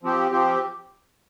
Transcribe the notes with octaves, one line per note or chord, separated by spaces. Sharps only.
F3 C4 G4
F3 C4 G4